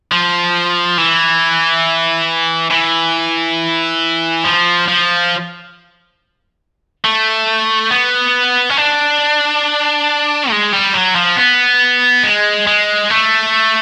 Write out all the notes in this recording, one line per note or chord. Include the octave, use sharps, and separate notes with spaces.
F3
E3
E3
F3
F3
A3
B3
C#4
D4
G#3
G3
F#3
F3
B3
G#3
G#3
A3